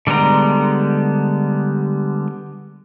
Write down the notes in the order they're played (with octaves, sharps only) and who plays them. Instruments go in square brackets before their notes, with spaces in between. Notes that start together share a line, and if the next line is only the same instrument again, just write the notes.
[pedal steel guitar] D3 G3 G#3 B3 A#5